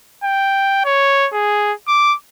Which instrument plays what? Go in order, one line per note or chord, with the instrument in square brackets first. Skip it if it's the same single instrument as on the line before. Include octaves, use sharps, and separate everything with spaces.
[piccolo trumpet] G5
C#5
G#4
D6